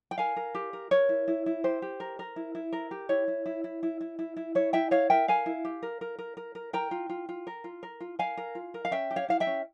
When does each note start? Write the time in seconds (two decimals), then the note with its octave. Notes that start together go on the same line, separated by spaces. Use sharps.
0.11 G5
0.18 A#4 F5 G#5
0.36 A#4
0.55 G4
0.73 A#4
0.91 A#4 C#5
1.09 E4
1.28 E4
1.46 E4
1.64 G4 C5
1.82 G4
2.00 A#4
2.19 A#4
2.36 E4
2.55 E4
2.73 A#4
2.91 G4
3.09 E4 C#5
3.28 E4
3.46 E4
3.64 E4
3.83 E4
4.01 E4
4.19 E4
4.37 E4
4.55 E4 C#5
4.73 E4 E5 G5
4.91 E4 C#5 F5
5.10 A#4 E5 G5
5.28 A#4 F5 G#5
5.46 E4
5.65 G4
5.83 A#4
6.01 A#4
6.18 A#4
6.37 A#4
6.55 A#4
6.73 A#4 G5 A#5
6.91 F4
7.09 F4
7.29 F4
7.47 A#4
7.64 F4
7.83 A#4
8.00 F4
8.19 A#4 F5 G#5
8.37 A#4
8.55 F4
8.74 A#4
8.85 F5
8.91 C#4 E5 G5
9.11 G4
9.16 C#5 F5
9.28 E4 F5
9.40 E5 G5
9.47 C#4